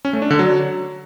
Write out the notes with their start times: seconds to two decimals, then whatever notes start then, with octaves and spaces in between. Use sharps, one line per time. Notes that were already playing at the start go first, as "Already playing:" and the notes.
0.05 C#4
0.13 A3
0.22 D4
0.30 D3
0.39 F#3